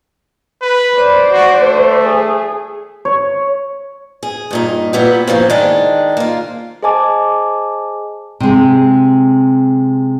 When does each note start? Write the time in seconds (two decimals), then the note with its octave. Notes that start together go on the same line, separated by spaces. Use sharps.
0.62 B4
0.95 C5 D5
1.32 F#4
1.62 A3
2.04 G#4
3.05 C#5
4.23 G#4
4.51 G2 A#2 D#4
4.93 A#2 B3 E4 G4
5.27 C#3 E3 F3 A#3
5.50 D#3 G#3 D4
6.17 A#3 F4
6.83 G#4 C5 D#5 G#5 A5 D6
8.40 C3 G#3